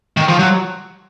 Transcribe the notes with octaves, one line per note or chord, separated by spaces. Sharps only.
D#3
F3
F#3